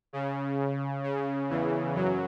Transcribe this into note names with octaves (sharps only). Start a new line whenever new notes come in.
C#3
C#3
E2 E3
F#2 F#3